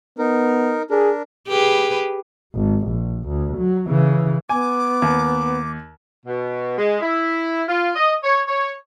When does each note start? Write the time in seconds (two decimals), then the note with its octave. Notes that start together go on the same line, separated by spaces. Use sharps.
0.19 B3 D#4 A#4
0.90 D4 G#4 A#4
1.48 G4 G#4 B4
2.55 G#1
2.87 A#1
3.28 D2
3.57 F#3
3.88 C#3 E3
4.49 B3 G#5 D6
5.02 D#2
6.26 B2
6.77 G#3
7.00 E4
7.68 F4
7.95 D#5
8.22 C#5
8.46 C#5